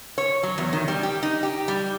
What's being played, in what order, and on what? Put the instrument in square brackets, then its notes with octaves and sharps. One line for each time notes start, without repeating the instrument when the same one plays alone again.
[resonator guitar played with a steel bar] C#5
F#3
E2
D#3
G3
G4
D#4
G4
G3